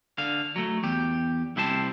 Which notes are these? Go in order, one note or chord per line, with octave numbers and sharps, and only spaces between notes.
D3 F5
F#3 A3
E2 G4
C2 E4 G4 C5 A5